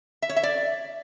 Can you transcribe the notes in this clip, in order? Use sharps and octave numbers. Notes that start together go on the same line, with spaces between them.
E5
C#5
E5
D5